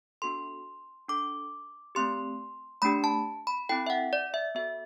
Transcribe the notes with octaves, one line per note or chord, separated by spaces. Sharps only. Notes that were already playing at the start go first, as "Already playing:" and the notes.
B3 D4 F#4 A4 C6
D4 A4 D6
A3 C4 G4 C6
A3 D4 G4 B5
A5
B5
C4 E4 A4 G5
E5
F#5
D5
E5
B3 F#4 A4 E5